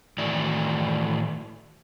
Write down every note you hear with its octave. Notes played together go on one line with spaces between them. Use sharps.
A2 D#3 E3 A3 F#4 D5